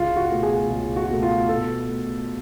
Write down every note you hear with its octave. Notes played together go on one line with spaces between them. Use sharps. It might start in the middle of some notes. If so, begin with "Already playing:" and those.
Already playing: C#2 F4
F#4
B2 A3
G#4
C#2
F#4
B2 A3
F4
B2 A4
A3